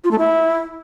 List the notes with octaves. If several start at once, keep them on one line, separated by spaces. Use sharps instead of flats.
F4
A3
E4